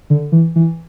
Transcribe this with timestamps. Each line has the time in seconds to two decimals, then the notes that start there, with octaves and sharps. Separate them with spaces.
0.10 D3
0.32 E3
0.56 E3